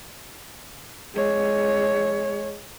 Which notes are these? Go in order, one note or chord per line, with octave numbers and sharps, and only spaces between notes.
G#3 C#5